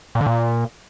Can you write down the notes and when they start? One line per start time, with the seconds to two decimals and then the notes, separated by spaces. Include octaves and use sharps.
0.15 A#2
0.21 D3
0.26 A#2